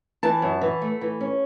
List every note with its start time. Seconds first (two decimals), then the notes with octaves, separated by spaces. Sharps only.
0.23 E3 A5
0.42 F#2
0.61 E3
0.82 A3
1.01 E3
1.21 C#4